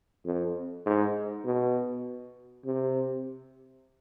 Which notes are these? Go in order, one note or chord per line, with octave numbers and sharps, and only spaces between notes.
F2
G#2
B2
C3